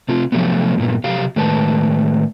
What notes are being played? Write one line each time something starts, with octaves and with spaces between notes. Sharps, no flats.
C3 C4 F4
C3 F3 F#3 G#3 A3 B3
G2 A#2 B3
C3 F#3 G4 F5
A2 D#3 G#3 B4 A5